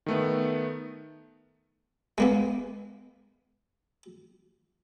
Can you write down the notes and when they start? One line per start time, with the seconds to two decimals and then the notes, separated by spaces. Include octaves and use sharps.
0.06 D#3 A3 B3
2.18 G#3 A#3 B3